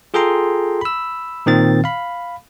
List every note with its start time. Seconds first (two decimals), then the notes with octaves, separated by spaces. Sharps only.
0.14 F4 G#4 A4 G5 A#5 C6
0.81 B5 E6
1.46 A#2 D#3 C4 A6
1.84 F5 B5